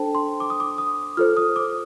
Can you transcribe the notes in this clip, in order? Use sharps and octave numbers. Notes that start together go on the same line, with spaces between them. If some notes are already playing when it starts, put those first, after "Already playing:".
Already playing: D4 A4 C5 G5 A5
C6
D6
D#6
D6
D#6
F4 A4 C5 F6
D#6
D6